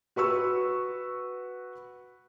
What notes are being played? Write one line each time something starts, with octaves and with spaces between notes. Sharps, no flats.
F#4 B4 C#6 E6